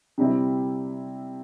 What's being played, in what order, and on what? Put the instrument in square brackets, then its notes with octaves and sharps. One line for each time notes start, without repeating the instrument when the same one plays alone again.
[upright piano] C3 G3 C4 E4